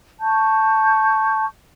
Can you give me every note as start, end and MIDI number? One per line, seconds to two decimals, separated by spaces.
0.21 1.45 81
0.21 1.45 85
0.21 1.45 91